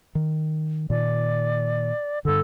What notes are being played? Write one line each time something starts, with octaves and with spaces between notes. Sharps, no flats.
D#3
A#2 D#3 D5
G2 D3 A4